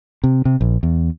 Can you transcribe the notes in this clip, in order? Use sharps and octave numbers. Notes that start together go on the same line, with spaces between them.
C3
C3
A#1
E2